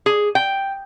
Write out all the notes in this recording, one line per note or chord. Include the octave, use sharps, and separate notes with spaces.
G#4
G5